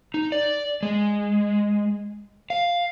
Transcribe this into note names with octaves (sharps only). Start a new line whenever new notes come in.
D#4
D5
G#3
F5